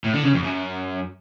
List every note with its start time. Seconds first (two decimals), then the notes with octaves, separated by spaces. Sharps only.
0.04 A2
0.14 D3
0.24 C#3
0.33 F2
0.43 F#2